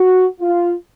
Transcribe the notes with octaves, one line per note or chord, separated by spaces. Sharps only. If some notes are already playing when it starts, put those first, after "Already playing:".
Already playing: F#4
F4